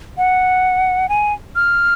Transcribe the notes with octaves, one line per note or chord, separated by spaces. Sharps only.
F#5
G#5
F6